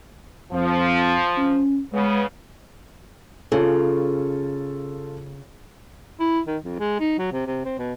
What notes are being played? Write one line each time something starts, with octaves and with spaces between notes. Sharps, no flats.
F2 F3
C#4
C#3 G#3 B3
C#3 F4 A4
E4
D#3
F2
G#3
D#4
F#3
C3
C3
C4
B2